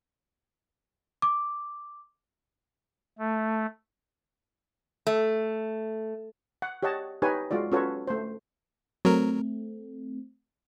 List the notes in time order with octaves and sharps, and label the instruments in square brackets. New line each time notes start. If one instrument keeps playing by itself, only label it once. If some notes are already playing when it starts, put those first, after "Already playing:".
[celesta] D6
[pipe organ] A3
[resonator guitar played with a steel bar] A3
[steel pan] F#5
G4 C#5 D#5 F#5 A5
D#4 G4 B4 C#5 G#5
G#3 F4 F#4 D5
C#4 F4 F#4 A4 B4 C#5
A3 C5
[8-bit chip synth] F#3 A#4 [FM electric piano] A3 C4